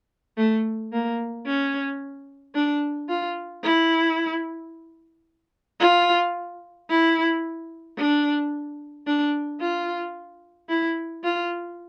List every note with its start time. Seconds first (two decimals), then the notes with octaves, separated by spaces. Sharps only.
0.37 A3
0.92 A#3
1.46 C#4
2.55 D4
3.09 F4
3.64 E4
5.80 F4
6.89 E4
7.98 D4
9.06 D4
9.60 F4
10.69 E4
11.24 F4